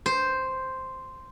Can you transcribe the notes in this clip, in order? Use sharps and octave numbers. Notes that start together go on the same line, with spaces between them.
C5